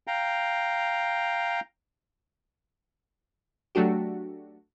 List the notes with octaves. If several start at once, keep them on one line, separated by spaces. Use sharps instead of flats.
F5 G5 A#5
F#3 A3 D4 F#4 G4